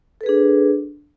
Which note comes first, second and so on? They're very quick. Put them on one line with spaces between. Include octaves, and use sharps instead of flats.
A4 B4 G#4 D4